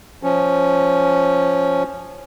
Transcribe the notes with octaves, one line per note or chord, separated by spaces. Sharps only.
F3 C#4